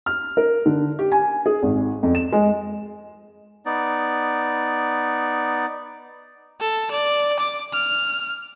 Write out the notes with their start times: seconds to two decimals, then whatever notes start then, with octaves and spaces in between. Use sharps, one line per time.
0.06 F6
0.37 A#4
0.66 D3
0.99 G4
1.12 G#5
1.46 G#4
1.63 G#1
2.03 F2
2.15 E7
2.32 G#3
3.66 B3 D#4 D5
6.60 A4
6.91 D5
7.39 D6
7.73 F6